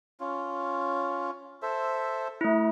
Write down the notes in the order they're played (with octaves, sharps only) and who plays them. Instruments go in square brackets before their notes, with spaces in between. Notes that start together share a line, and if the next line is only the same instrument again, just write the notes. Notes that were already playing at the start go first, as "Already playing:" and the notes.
[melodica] C#4 F4
A4 C5 E5
[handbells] A3 E4